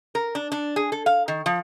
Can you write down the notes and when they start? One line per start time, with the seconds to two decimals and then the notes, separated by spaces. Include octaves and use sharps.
0.15 A#4
0.35 D4
0.52 D4
0.76 G#4
0.92 A4
1.06 F5
1.28 D#3
1.46 F3